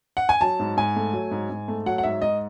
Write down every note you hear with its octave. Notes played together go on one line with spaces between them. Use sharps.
F#5
G#5
F#3 A5
G#2
G#2 G#5
A3
F#3
G#2
G#2
A3
F#3 F#5
F#5
G#2 E5
G#2 D#5